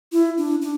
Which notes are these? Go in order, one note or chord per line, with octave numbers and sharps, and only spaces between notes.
E4
D4
D4